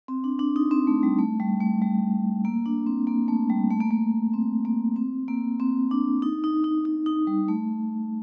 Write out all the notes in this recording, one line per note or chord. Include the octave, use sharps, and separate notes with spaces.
C4
D4
D4
D#4
C4
A3
G3
A3
G3
A3
G3
A#3
D4
C4
A#3
A3
G3
A3
A#3
A3
C4
A#3
C4
A#3
C4
D4
D#4
D#4
D#4
D#4
D#4
G3
A3